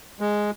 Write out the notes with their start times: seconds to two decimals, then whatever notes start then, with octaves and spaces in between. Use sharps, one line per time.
0.20 G#3